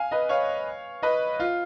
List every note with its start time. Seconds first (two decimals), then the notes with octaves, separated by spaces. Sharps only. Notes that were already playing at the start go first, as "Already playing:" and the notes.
Already playing: F5 G#5
0.11 B4 D#5
0.29 C#5 F5
1.03 B4 D#5
1.40 F4